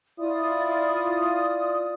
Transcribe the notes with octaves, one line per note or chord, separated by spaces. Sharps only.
E4 F4 D5 D#6